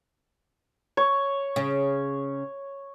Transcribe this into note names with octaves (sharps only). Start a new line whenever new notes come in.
C#5
C#3